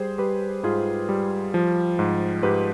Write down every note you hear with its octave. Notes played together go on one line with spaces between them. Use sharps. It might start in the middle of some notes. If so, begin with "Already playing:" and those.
Already playing: G3 G#4 C5
G3 G4 B4
G#2 F4 G#4
G3
F3
G#2
G#2 G4 B4